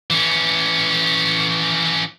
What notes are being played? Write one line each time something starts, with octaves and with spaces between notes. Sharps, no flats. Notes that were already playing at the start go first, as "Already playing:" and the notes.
E3 C#4